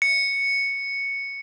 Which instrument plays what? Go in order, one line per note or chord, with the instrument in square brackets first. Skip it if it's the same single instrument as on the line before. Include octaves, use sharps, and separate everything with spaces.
[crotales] C#7